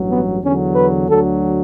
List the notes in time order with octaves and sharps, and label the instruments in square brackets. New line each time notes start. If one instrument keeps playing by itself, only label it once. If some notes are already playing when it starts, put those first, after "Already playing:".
Already playing: [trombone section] A1 G2 F#3
B3
E2 D3 F#3 C#4
B4
D2 D3 F#3 A4